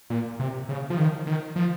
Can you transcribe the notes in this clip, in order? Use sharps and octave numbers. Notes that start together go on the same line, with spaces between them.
A#2
C3
C#3
F3
D#3
D#3
F3